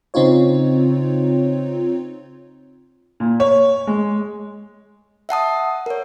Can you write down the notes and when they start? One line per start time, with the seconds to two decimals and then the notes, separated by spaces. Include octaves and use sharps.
0.14 C#3 C4 D#4 F4 C#5
3.20 A#2
3.40 C#5
3.87 G#3
5.29 E5 F#5 A5 D#6
5.86 A#4 C#5